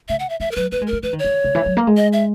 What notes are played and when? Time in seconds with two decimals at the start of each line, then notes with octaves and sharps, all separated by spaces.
0.09 C#3 E5
0.19 F#5
0.30 E5
0.40 E3 E5
0.51 A#4
0.56 F#3 B4
0.72 A#3 B4
0.81 G#3
0.87 A#4
0.93 G#3
1.03 E3 B4
1.13 D#3
1.19 C#5
1.24 D#3
1.44 C#3
1.55 E3
1.66 F#3
1.77 A#3
1.87 G#3
1.97 D#5
2.13 E5